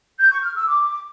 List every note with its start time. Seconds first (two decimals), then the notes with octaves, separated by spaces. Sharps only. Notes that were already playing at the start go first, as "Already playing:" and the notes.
0.19 G6
0.31 C#6
0.43 F6
0.55 E6
0.67 D6